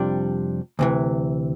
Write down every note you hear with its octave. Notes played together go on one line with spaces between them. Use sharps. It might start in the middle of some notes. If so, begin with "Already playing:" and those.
Already playing: F2 C3 G3 D4
D2 C3 E3